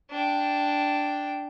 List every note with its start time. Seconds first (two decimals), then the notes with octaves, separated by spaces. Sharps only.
0.10 D4 G5